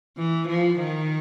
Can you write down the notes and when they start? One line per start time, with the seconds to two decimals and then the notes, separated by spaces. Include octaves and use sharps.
0.18 E3
0.48 F3
0.79 D#3